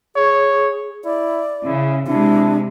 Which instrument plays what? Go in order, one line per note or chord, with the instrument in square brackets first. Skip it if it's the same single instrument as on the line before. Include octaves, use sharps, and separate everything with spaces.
[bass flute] G#4 [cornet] C#5
[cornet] E4 [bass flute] D5
[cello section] C#3 [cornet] E4
[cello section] C3 G#3 [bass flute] D4 [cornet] E4